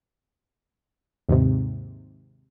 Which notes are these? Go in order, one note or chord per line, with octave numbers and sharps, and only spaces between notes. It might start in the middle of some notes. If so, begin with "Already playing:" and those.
D#2 G#2 C3